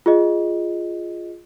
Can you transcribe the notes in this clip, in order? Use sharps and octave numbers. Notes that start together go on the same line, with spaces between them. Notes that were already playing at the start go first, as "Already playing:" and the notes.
F4 G#4 D#5